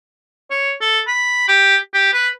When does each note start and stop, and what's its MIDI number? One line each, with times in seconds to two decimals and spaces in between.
0.51 0.72 73
0.81 1.00 69
1.07 1.45 83
1.48 1.77 67
1.94 2.10 67
2.13 2.28 71